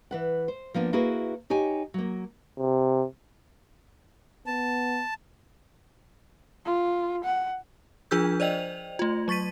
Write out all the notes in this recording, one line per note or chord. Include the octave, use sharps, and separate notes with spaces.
E3 B4 F#5
C5
F3 A#3 B3 D4
A#3 E4 F#4 G#4 B4
D#4 G4 C#5 G#5
F#3 A#3
C3
B3 A5
F4
F#5
F3 D4 F4 G#4 E6 G6
C5 D5 D#5 G5 F7
A3 F4
F#3 C#6 A6 B6 D#7